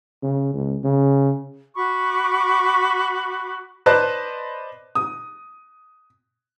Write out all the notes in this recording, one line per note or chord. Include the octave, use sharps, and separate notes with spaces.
C#3
C#2
C#3
F#4 B5 C#6 D6
B4 C5 D5 D#5 A5 F#6
D#6